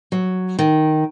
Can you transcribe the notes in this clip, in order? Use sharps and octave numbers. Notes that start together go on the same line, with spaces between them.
F#3
D#3